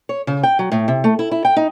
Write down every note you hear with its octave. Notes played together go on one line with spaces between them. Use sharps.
C#5
C#3
G5
F#3
A2
C3
A3
E4
E4
G5
D#4